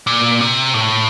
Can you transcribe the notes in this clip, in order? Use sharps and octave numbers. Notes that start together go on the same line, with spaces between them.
A#2
C3
A2